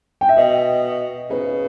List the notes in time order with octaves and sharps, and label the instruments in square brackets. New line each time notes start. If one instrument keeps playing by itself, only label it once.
[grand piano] G5
E5
[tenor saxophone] B2 [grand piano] D#5
[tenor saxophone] C#3 [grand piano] B4